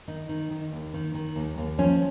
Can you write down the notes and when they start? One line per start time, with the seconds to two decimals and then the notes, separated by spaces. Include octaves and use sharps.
0.08 D#3 D#4
0.29 D#3
0.51 D#3
0.72 D#2
0.94 D#3
1.14 D#3
1.36 D#2
1.58 D#2
1.78 F3 C#4